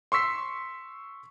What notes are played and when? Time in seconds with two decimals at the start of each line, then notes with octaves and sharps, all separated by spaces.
0.12 C6 C#6 E6 B6 C7